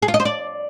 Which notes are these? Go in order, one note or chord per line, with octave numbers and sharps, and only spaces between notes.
G#4
F4
D#5
C5
D5